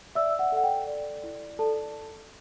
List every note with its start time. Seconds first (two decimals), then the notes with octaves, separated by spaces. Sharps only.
0.15 D5 E5 E6
0.39 F#5
0.52 A4 F#5
0.64 G5
0.87 D5
1.23 E4
1.59 A4 D5 A5